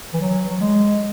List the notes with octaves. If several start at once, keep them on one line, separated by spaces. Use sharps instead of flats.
E3
F#3
F#3
G#3